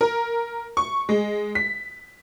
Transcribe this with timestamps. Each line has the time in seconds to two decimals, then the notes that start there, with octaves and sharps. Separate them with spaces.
0.01 A#4
0.77 C#6
1.09 G#3
1.55 B6